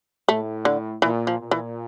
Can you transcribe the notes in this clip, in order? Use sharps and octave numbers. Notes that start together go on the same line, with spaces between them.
A2 A3
D3
A#2 E3
F3
A#2
E3